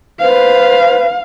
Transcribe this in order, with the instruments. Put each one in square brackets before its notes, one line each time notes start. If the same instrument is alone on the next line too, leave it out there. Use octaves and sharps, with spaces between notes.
[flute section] B4 C5 [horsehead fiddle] F5